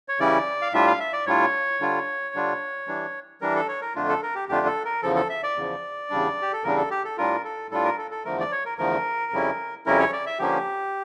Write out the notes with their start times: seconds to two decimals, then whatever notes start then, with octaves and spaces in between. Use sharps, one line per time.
0.08 C#5
0.19 C#3 E3 G3 C#4 E4 D5
0.62 F5
0.73 A2 G3 D4 F4 E5
0.87 F5
1.00 E5
1.13 D5
1.26 A2 G3 D4 F4 C#5
1.80 D3 G3 D4 F4
2.35 D3 G3 D4 F4
2.87 E3 G3 D4
3.41 E3 G3 D4 A#4
3.55 A4
3.68 C#5
3.81 A#4
3.95 F2 D3 A3 D4 F4
4.09 A4
4.22 A#4
4.35 G4
4.49 F2 D3 A3 D4 F4 G4
4.67 A4
4.85 A#4
5.02 E2 C#3 F3 A4
5.16 A4
5.30 E5
5.43 D5
5.56 E2 C#3 F3
6.10 E2 C#3 G3 D4
6.42 G4
6.53 A4
6.64 E2 C#3 G3 D4 A#4
6.77 A4
6.91 G4
7.05 A4
7.17 A2 G3 D4 F4 A#4
7.44 A4
7.71 A2 G3 D4 F4 A4
7.84 A#4
7.98 A4
8.11 A4
8.25 E2 D3 F3 A3 A#4
8.40 D5
8.52 C#5
8.65 A#4
8.78 E2 D3 F3 A3 A#4
9.32 F2 C#3 G3 C#4 E4
9.86 F2 C#3 G3 C#4 E4 A#4
9.99 C#5
10.13 D5
10.26 E5
10.39 D3 F3 A#3 C#4 G4